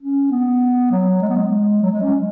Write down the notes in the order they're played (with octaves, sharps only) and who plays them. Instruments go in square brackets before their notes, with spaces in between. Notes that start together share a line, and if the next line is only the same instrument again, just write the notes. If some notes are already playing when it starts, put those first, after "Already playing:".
[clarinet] C#4
B3
F#3
G#3
B3
G#3
F#3
G#3
C#4